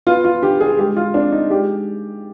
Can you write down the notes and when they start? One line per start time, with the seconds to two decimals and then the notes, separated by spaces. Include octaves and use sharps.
0.07 B3 F4
0.24 F4
0.42 D3 G4
0.60 G#4
0.79 G#3 G4
0.97 F4
1.14 C4 D4
1.32 D#4
1.50 G#3 G4